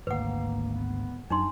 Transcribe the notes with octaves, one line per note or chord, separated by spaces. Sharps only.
G#1 D2 A#3 B4 F#5
B3
F#2 D4 D#4 C6